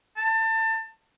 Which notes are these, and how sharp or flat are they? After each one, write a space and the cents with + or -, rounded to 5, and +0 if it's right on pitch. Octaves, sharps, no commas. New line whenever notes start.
A5 +25